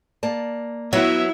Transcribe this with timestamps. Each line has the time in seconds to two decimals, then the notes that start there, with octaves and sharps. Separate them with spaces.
0.23 A#3 D5 A5
0.93 F#3 B3 E4 B4 E5 F#5